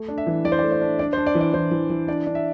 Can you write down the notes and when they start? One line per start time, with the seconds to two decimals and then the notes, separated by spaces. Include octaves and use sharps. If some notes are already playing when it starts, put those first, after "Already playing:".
Already playing: A3
0.08 D4
0.18 E5
0.27 E3
0.45 E3 D5
0.52 C5
0.59 D5
0.63 A3
0.72 C5
0.81 D4
0.99 D4 D5
1.13 C5
1.17 D4
1.26 D5
1.35 E3
1.41 D5
1.54 E3 C5
1.71 E3
1.90 E3
2.08 D4 D5
2.27 D4
2.35 E5